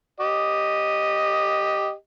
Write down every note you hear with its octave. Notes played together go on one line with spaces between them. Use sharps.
G4 D#5